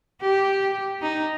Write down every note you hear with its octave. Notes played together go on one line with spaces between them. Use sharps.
G4
D#4